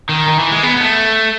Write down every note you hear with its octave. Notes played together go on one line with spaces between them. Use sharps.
D#3
D#3
E3
G#3
B3
B3
A3